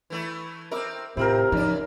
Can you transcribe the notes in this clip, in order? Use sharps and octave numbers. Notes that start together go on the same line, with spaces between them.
E3 A3 E4
C4 A#4 E5 D6 E6
A2 C3 C4 E4 F4 A#4
C#3 F3 D#4 D5